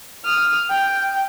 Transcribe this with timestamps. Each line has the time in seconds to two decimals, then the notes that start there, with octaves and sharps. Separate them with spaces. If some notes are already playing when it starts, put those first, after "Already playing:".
0.24 D#6 F6
0.70 G5